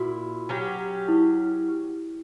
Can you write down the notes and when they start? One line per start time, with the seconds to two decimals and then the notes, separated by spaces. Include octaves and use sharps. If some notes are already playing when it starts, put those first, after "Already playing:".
Already playing: A#2 E4 F#4
0.49 F#3 C#4 G4
1.08 E4